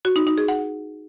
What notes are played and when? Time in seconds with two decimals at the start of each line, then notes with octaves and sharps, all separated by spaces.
0.05 F#4
0.16 D#4
0.27 D#4
0.38 G#4
0.48 F#5